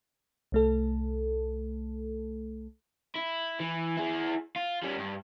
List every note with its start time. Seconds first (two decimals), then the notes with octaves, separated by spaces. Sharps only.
0.52 C2 A3 A4
3.15 E4
3.60 E3
3.97 E4 G#4
4.56 F4
4.82 G3 C#4
4.98 G2